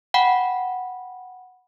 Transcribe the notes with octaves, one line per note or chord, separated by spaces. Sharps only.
F#5 G5 B5